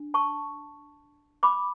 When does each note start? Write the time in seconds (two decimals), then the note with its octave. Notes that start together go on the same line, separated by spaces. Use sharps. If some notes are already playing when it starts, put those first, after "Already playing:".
Already playing: D4
0.14 A5 C#6
1.43 B5 D6